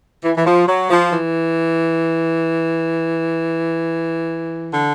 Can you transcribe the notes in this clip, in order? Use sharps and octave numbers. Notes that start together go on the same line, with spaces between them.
E3
E3
F3
F#3
F3
E3
D3